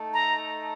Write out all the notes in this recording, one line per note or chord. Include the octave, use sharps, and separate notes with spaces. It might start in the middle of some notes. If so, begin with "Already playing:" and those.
Already playing: A3 D#4 A4
A#5